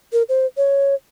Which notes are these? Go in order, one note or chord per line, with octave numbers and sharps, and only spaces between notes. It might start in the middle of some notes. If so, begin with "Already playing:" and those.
A#4
C5
C#5